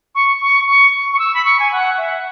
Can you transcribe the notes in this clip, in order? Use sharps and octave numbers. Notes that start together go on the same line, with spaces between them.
C#6
C#6
C#6
C#6
E6
B5
C#6
G#5
F#5
E5